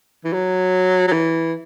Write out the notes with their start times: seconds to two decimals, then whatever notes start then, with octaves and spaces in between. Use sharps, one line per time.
0.25 E3
0.33 F#3
1.08 F#3
1.12 E3